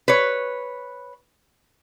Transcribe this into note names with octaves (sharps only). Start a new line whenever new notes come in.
B4 C#5